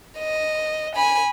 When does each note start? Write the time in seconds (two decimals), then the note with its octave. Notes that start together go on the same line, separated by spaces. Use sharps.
0.18 D#5
0.96 G#5 B5